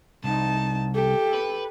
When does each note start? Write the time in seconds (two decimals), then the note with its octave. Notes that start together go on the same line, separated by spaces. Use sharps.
0.24 C2 D#4 A5
0.94 G4 A4
1.34 B4